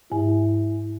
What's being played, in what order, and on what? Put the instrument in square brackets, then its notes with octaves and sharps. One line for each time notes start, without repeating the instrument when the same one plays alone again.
[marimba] G#2 [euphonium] E4